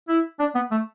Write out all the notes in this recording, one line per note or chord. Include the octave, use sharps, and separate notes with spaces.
E4
D4
B3
A3